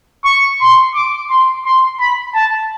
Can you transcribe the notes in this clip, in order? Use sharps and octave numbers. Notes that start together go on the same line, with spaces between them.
C#6
C6
D6
C6
C6
B5
A5